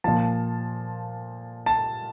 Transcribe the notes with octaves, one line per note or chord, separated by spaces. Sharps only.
A#2 F3 A5
A5